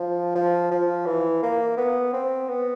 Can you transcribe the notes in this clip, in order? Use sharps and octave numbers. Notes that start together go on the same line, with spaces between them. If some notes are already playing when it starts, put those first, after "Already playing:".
Already playing: F3
F3
F3
E3
A#3
B3
C4
B3